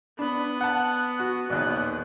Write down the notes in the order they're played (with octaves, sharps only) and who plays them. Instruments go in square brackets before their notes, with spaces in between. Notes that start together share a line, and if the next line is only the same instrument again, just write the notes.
[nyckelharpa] B3 [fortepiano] D4 [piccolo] B5
[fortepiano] F#5 A5 [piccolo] F#6
[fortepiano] F#4
[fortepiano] A#1 D#2 [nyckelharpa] B3 [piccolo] F#6